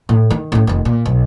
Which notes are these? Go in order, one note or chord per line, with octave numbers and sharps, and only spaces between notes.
A2
D#3
A2 C#4
F1 D#3
A#2
B1